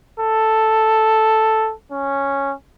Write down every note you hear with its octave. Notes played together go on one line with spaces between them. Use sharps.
A4
C#4